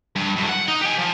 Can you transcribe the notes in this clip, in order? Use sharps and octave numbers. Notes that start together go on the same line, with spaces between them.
G2
F#2 A2
F#5
D#4
G4 G#5
F3